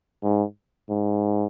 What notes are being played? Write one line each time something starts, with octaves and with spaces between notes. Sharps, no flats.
G#2
G#2